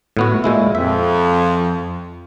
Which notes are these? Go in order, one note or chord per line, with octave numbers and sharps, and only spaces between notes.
A2 B3 F#4
A#2 G#3 E4
F2 E5